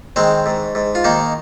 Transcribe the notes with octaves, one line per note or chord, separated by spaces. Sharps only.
D#3 G#3 C4
G#2
G#2
F4
D#3 A#3 D#4